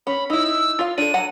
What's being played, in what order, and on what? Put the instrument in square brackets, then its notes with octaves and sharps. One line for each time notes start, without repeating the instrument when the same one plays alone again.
[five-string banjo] C#4 [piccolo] B5
[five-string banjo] D#4 E4 [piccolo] E6
[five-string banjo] F4 F5
[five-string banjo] D4 A4 [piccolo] D#7
[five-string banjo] F#3 F#5 A5